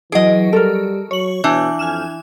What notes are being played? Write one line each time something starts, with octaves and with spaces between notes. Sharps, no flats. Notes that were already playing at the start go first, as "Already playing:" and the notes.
E3 F#3 G#4 D#5 D7
G3 A4 A#4
F#3 C#5 F#7
B2 E3 D4 F#6 G6
F2 G#5 F6 E7